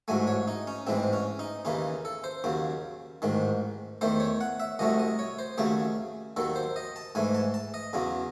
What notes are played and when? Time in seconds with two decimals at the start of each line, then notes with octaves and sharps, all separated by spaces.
0.08 A1 G#2 F#3 A3 G#5
0.27 C#5
0.48 D#4
0.67 C#4
0.87 A1 G#2 E3 G#3 C4
1.13 C#4
1.39 D#4
1.65 D#2 C#3 E3 D#4
2.05 A4
2.24 C5
2.44 D#2 C#3 F#3
3.22 A1 G#2 D#3
4.01 E2 D#3 A3 C5
4.20 C#5
4.41 F#5
4.60 E5
4.79 C2 C3 F#3 A3 D#5
4.99 D#5
5.19 C#5
5.39 C5
5.58 D#2 C#3 F#3 A3 G#4
6.37 D#2 D#3 F#3 A4
6.56 C5
6.76 D#5
6.96 A5
7.15 G#2 E3 A3 G#5
7.35 A5
7.54 A5
7.74 D#5
7.93 E2 C#3 F#3